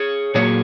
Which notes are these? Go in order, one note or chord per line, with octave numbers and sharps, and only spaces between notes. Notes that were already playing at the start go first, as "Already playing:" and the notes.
Already playing: G#4 C#5
A#2 F#3 A#3 G#4 C#5